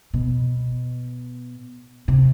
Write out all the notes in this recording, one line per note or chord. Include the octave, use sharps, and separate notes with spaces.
B2
C3